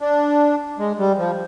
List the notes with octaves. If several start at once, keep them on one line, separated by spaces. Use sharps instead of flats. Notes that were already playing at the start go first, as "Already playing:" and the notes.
D4
G#3
G3
F3